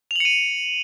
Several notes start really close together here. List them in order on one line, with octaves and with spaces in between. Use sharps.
F7 F#7 C#7 D#7